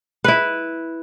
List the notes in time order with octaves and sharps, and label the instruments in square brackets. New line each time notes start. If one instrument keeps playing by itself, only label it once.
[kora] E4 B4